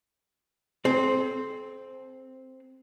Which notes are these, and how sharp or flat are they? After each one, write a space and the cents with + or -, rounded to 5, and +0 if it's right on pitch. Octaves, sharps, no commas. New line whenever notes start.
C4 +0 A4 -45